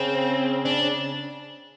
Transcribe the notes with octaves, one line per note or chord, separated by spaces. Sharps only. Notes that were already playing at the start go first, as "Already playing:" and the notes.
Already playing: C#3 C4
D4